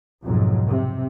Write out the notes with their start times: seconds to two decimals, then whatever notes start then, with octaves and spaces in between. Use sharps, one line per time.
0.24 B1 F2 G#2 F#3
0.68 C3